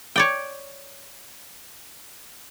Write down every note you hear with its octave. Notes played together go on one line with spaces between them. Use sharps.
C#5 D5 G5